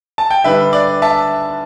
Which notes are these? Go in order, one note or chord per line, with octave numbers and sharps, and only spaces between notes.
A5
G5
D3 G3 D4 B4 E5
D5
E5 A5